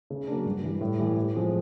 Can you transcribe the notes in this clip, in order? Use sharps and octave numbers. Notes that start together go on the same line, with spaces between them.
C#3
F#3 A#3 D4
G2
E3 G3
A2
E3 G3
A2
F3 G#3 C4 F4